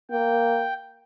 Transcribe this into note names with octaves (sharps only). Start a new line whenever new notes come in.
A#3 G5